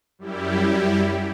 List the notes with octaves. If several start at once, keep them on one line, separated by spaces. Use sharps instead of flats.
F#2 G3 E4 G4